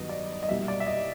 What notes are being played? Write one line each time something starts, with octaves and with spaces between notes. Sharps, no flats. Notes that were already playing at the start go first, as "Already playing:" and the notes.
Already playing: G2 D#3 F#3 B3 D#5
D5
D#5
C2 B2 G3 A#3 E5
D5
E5
D#5